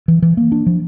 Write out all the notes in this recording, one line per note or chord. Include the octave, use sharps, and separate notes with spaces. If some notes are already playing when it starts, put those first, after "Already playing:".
E3
E3
A#3
D4
F3